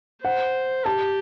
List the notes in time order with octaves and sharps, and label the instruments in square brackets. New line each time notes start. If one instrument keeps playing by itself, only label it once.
[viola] C5 [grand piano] F#5
[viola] G4 [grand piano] A5